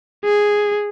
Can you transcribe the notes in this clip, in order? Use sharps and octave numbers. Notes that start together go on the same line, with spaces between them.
G#4